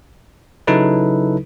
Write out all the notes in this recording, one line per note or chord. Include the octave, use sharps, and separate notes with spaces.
C#3 F#3 D#4 E4 A4 B4